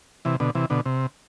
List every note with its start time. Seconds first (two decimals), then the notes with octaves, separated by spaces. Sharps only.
0.25 C3 E3
0.40 B2 D3
0.55 C3 E3
0.70 B2 D3
0.86 C3